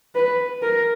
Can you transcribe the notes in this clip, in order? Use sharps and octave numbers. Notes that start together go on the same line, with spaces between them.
B4
A#4